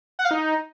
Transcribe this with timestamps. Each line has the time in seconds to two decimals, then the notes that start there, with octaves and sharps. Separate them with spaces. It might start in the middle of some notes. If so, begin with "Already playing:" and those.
0.19 F#5
0.25 F5
0.31 D#4